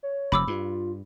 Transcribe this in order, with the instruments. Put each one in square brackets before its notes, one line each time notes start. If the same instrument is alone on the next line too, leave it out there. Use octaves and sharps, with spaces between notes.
[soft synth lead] C#5
[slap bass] F1 F2 [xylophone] B5 D6 E6
[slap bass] G2 [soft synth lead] F4